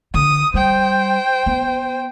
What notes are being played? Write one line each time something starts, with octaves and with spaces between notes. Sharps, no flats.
D3 D#6
G3 C5 G5
B3